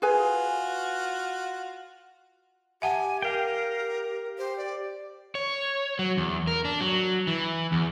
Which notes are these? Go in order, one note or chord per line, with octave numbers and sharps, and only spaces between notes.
F4 F#4 G#4 B4 G#5
G4 E5 F#5 G#5 A5
A#4 F5 G5
G4
G4 C5
D5
C#5
F#3
E2
A#4
D4
F#3
E3
E2